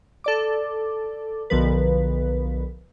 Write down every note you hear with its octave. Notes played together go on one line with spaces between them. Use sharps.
A4 D5 D6
B1 D3 F3 A#4 B4